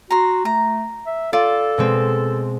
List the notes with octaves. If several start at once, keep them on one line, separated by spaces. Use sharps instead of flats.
F#4 A#5 C6
A3 A#5
E5
F4 A4 D5
B2 G#3 C4